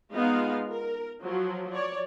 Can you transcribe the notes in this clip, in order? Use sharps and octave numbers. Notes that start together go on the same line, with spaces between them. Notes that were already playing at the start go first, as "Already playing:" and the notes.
G#3 B3 D#4 F4 F5
A#4
F3 F#3
C#5 D5